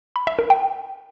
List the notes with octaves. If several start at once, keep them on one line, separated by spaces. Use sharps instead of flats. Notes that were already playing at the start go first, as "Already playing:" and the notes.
B5
E5
A#4
G5